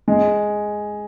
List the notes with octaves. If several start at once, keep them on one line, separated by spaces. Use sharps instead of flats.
G#3